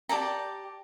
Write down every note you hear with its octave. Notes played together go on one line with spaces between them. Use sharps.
G4 D5 A5 A#5